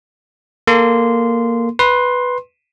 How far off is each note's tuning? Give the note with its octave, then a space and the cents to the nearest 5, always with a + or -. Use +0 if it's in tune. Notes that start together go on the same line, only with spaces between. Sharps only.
A#3 +0 A4 +0 C6 -15
B4 +0 C6 +15